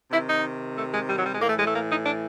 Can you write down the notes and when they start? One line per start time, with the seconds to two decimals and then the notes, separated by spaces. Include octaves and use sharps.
0.11 C3 D#3 E4
0.29 D#4
0.77 A3
0.93 G#3
1.08 G3
1.17 F#3
1.24 G3
1.32 G#3
1.40 A2 A#3
1.45 E3 A3
1.56 G#3
1.65 A3
1.73 A#3
1.88 D#4
2.04 D4